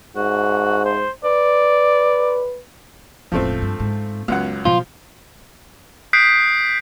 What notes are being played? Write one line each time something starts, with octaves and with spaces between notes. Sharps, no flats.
G#2 F#4
C5
B4 D5
E1 A1 F3 A3 C4
G2
G#2
C#2 F#2 B3 F#5
B2 F3 F#3 F4
D#6 F#6 G6 B6 C7 D7